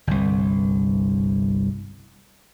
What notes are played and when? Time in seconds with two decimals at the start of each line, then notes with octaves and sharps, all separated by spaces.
0.07 G1 C2